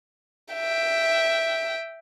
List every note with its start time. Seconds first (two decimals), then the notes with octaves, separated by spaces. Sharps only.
0.54 E5 G5